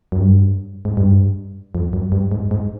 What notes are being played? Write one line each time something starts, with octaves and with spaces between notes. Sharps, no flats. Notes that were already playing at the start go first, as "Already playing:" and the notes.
F#2
G2
G#2
G2
F2
F#2
G2
G#2
G#2